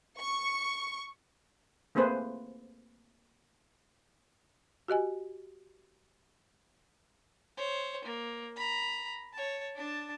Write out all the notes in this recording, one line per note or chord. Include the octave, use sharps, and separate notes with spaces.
C#6
A3 A#3 C4 G#4 B4 C5
F#4 G4 D#5 G#5
C5 C#5
A#3
A#5 B5
C#5 A5
D4 A5